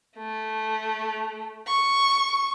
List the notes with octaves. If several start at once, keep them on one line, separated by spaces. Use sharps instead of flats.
A3
C#6